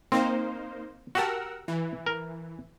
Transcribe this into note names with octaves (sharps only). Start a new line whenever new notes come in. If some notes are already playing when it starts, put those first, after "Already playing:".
A#3 C4 D#4 C5
F#4 G4 A#4 F#5 A5 E6
E3
A#4